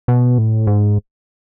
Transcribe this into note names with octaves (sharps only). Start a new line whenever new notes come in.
B2
A2
G#2